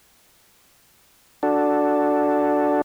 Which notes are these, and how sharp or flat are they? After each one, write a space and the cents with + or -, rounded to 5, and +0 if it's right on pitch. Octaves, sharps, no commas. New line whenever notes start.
D4 +0 F#4 -5 A4 +0